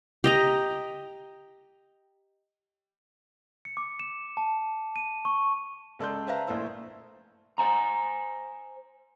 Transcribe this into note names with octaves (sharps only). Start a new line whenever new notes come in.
G4 D#5 A#5
C#7
D6
E7
A5
D#7
C#6
C#2 A4 D5 C6 G6
B4 C5 E5 F5 A5 A#5
A#1 A#2 A3 E4 C5 E6
C5 G#5 A#5